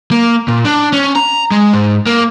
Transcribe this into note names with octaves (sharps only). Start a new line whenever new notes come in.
A#3
A#2
D4
C#4
A#5
G#3
G#2
A#3